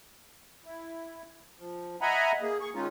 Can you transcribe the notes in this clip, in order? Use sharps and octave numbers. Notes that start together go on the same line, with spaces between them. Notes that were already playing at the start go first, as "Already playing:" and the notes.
E4
F3
D#5 E5 F#5 G#5 A#5 B5
A#3 G#4
G#4 C#6
D#3 G#3 C#4 D#4 F4